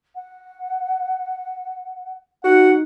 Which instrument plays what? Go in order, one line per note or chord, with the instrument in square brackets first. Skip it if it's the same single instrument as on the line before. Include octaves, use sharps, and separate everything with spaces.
[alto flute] F#5
[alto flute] D#4 [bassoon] F#4 [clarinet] F#5